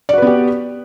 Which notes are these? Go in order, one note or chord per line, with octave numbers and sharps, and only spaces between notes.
B3 F#4 G4 B4 D5